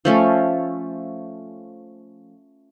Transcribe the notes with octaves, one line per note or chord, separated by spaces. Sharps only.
F3 A3 C#4